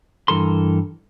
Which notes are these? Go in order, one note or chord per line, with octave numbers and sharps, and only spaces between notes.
G2 E3 A4 A#4 C6